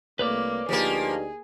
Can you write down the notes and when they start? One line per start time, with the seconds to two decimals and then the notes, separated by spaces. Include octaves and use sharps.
0.19 C2 A3 A#3 B4 C#5 D5
0.69 D2 F3 A#3 D#4 G4 G#4